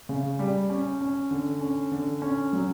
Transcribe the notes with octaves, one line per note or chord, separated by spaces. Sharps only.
C#3
G3
C#4
C#4
D3
C#4
D3
C#4
F#3